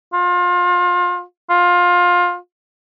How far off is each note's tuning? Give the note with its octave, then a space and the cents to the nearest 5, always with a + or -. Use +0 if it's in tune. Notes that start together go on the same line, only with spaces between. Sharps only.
F4 +30
F4 +20